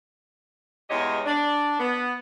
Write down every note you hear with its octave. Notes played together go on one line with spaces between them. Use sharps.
E2 G#2 G#3 G4 C#5 D#5
D4
B3